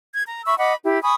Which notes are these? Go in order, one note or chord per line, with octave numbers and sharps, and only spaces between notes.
G#6
A#5
E5 B5 C#6 E6
D#5 F#5 B5 D6
E4 G4
G#5 B5 C#6 D#6